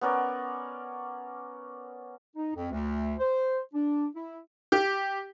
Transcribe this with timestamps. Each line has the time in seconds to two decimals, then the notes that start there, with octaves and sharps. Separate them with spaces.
0.01 B3 C#4 A#4 D5
2.35 D#4
2.54 F2
2.71 D2
3.19 C5
3.73 D4
4.15 E4
4.72 G4